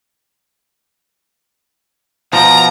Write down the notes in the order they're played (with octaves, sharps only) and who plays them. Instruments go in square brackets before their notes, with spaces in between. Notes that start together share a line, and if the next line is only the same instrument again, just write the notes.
[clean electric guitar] B2 F3 [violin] A#5